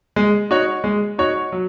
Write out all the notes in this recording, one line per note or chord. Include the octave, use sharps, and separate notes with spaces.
G#3
D#4 F#4 C#5
G#3
D#4 F#4 C#5
F#3